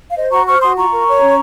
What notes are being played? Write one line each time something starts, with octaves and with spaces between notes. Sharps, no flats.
F5
C5 D#5
F#4 A#5 C#6
C5 C#6 F6
F#4 C6 D#6
F4 A#5 C#6
A#4
C#5
C#4